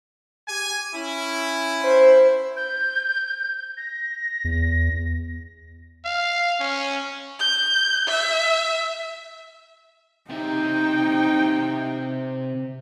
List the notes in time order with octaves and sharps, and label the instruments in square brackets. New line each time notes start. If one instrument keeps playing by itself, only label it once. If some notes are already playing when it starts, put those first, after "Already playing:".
[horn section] G4 G#5
C#4 E4
[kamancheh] C5
[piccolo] G6
A#6
[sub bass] E2
[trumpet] F5
C#4
[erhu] G6
E5
[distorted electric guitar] C3 E5 [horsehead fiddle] D#4 G5